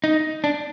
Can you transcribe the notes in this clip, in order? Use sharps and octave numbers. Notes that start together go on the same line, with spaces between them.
D#4
D4